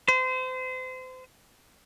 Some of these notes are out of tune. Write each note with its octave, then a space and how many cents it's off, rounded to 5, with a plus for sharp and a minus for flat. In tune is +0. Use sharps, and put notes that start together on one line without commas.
C5 -30